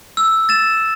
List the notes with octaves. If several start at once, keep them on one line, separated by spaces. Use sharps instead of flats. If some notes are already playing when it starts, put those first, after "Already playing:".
E6
A6 E7